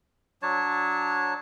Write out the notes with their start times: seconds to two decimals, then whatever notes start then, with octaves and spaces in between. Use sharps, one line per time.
0.42 F#3 D4 C#5 A5